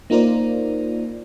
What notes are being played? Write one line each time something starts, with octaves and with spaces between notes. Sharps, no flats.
A#3 D#4 F4 A#4 C5 D5